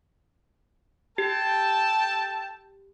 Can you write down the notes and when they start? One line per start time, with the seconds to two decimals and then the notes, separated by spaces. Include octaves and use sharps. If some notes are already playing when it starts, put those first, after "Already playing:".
1.18 G4 A4 G5 A5